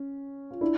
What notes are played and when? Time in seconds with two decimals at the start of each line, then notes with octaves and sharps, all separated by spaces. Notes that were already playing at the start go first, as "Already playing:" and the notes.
Already playing: C#4
0.51 F4
0.61 D4 E4